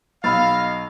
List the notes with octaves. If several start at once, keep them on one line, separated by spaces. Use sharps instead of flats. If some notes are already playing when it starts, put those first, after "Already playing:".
B1 D#5 F5 B5 E6 A6